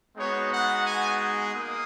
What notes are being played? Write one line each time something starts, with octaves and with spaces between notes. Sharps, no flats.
G#3 B3 D#4 F#4 C#5
F#5
G#5
A#3 D#6